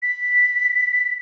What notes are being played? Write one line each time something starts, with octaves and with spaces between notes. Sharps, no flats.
B6